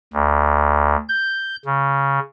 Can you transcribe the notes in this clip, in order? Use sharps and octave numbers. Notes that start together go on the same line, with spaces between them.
D2
G6
C#3